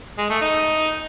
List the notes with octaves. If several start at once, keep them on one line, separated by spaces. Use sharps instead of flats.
G#3
A3
D#4